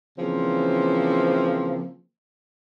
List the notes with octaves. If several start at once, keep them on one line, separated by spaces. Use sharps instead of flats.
C#3 E3 F3 A#3 C4